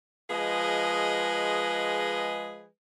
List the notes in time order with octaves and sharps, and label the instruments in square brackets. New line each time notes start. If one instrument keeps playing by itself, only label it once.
[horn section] F3 G#3 G#4 B4 D#5